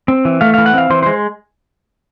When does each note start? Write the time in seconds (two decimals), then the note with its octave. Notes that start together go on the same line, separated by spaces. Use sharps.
0.08 C4
0.25 E3
0.41 A3 F5
0.54 E3 F5
0.66 F#5
0.74 C4 F5
0.90 E3 C5
1.03 G#3 C5